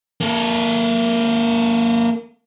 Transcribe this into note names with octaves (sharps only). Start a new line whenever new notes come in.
A#3 A4